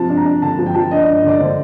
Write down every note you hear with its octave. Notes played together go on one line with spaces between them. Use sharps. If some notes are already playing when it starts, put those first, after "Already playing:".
Already playing: C3 F3 A5
D4
A#5
D4
D3 A5
F3
G5
F3 A5
G5
D4 D#5
D5
D4
D#5
D3 D5
D3 C5